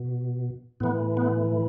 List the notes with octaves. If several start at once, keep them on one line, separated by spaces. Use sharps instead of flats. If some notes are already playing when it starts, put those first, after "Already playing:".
Already playing: B2
A2 E3 B3
B3